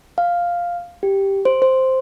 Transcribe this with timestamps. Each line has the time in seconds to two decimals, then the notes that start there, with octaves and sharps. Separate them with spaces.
0.18 F5
1.03 G4
1.45 C5
1.62 C5